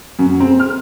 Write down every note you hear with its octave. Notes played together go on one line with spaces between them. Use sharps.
F#2
C4
F6